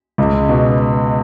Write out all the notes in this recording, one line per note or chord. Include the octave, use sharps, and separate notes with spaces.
C#2
B2